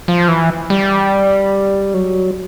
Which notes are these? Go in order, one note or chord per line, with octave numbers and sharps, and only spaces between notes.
F3
E3
G3
F#3